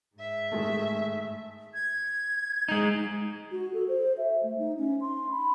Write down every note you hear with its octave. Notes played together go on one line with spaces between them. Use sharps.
G#2 E5
D#3 G#3 A3
G#6
G#3 D#4
F#4
A4
C5
E5
A3
D#4
C#4
C6
B5